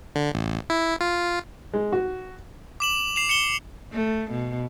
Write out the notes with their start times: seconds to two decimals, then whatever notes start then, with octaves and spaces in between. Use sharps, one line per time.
0.15 D3
0.34 A1
0.70 E4
1.01 F4
1.74 G#3
1.92 F#4
2.80 D6 E7 F#7
3.16 C7 E7 F7
3.29 C#7 E7 G7
3.93 A3
4.32 B2